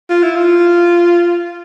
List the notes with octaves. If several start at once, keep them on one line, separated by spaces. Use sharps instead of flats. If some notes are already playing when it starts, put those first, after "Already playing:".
F4
E4
F4